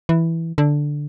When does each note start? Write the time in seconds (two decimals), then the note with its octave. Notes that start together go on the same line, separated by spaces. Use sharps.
0.09 E3
0.58 D3